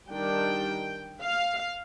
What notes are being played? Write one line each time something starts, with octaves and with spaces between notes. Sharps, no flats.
D#3 G3 D4 G5
F5